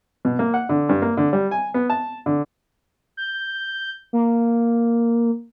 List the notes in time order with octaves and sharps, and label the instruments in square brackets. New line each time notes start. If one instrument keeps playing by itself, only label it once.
[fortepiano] B2
A#3
F#5
D3
G2
A#3
D3
G3
G#5
B3
A5
D3
[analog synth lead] G6
A#3